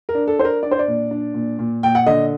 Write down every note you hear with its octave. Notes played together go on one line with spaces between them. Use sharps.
A#4
D4
A4
D4 C5
A#4
D4 D5
C5
D5
A#2
D4
A#2
A#2
A#2 G5
F#5
D3 D#5